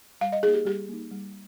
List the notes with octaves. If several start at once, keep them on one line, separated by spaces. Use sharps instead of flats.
G3 F5
D#5
A#3 D#4 G#4
G4
G3 G4
A#3 D#4
G3